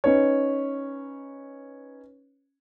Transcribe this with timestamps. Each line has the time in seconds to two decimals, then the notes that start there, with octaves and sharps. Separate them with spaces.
0.04 C#4 D#4 B4 C#5